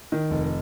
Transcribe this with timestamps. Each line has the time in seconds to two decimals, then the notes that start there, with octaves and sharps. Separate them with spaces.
0.12 D#3
0.31 F1